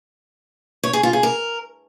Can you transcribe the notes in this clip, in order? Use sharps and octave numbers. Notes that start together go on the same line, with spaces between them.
C#5
G#4
F4
G#4
A#4